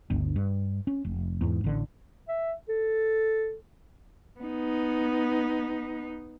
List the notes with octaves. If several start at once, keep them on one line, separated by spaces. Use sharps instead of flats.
G1 D2
G2
C#4
F1
E2 G#2
A1 D3
E5
A4
B3 D#4